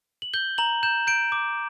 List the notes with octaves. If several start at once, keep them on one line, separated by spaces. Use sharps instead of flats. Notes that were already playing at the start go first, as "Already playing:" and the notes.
F#7
G6 G7
A#5 F#7
G6 E7
G6 D7
D6